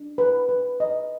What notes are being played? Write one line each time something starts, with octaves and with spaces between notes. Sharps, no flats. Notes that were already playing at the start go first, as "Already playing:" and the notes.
Already playing: D4
B4
B4
D#5